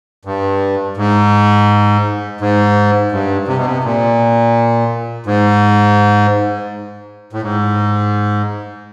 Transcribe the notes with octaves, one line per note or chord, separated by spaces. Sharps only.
G2
G#2
G#2
G2
C3
B2
C3
A#2
G#2
A2
G#2